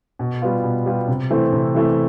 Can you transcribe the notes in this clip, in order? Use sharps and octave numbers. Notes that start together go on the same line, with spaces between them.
B2
G3 B3 F4
B2
G3 B3 F4
C3
E3 A3 C4
C3
E3 A3 C4